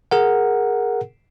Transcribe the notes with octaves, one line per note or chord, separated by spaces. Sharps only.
G#4 A#4 F#5